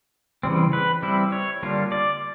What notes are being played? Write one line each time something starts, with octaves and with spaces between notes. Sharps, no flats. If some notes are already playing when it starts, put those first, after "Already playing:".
C#3 E3 G3 C4
B4
G3 C4 E4
C#5
D3 G3 A#3 D4 F4
D5